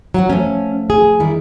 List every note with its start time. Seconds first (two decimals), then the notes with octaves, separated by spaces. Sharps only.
0.14 F#3 F#4 F#5 A#5
0.29 F3 A3 C#4
0.90 G#4
1.20 D#3 G3 E4